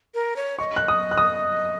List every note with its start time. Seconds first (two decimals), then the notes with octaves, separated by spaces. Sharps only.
0.14 A#4
0.36 C#5
0.59 D#5 C#6
0.76 F#6
0.88 D#6
1.11 F#6
1.17 D#6